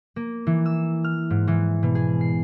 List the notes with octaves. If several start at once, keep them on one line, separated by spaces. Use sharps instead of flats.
A#3
E3
E6
F6
G#2
E3
B2
G#4
C7